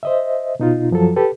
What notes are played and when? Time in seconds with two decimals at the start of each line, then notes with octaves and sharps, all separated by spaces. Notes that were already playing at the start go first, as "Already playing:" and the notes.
0.03 C5 D#5 E5
0.60 B2 D#4 F4
0.91 F#2 F3 F#3 A4
1.16 G4 A4 B4